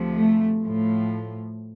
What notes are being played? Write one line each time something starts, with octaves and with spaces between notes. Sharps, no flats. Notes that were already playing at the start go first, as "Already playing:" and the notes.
Already playing: D2 C3 F3
A3
F3
A2